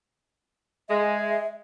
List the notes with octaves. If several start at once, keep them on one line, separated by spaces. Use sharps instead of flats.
G#3 E5